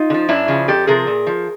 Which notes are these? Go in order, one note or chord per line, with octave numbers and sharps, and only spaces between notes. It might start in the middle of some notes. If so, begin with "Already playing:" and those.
Already playing: D#4 F4
D3
F3
F#2 D4 E4
C#3 F3
F2 G4 A4
C3 F3 G#4 A#4
A#2
F3